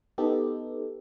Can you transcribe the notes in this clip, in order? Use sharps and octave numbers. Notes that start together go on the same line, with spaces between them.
B3 D#4 G4 A4